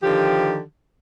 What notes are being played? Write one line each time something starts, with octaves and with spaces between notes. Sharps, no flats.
D3 D#3 F3 G4